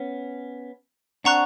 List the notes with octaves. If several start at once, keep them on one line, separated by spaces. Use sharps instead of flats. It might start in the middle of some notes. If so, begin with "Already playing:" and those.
Already playing: B3 C#4
C4 D4 F#5 A#5 C#6 F#6